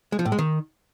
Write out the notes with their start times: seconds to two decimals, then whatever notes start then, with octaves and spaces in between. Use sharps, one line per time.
0.12 G#3
0.19 F3
0.25 A2
0.32 G#3
0.39 D#3